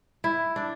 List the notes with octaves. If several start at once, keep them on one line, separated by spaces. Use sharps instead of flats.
E4
D4